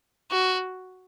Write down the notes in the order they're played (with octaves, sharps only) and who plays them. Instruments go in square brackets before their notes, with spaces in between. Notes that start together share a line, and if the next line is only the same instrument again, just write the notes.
[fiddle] F#4